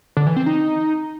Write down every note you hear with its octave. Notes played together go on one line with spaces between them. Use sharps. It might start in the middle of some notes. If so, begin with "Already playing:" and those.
D3
E3
C4
D#4